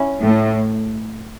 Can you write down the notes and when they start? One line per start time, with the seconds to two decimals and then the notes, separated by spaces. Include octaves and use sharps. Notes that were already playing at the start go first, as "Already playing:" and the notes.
Already playing: C#4 E4
0.21 A2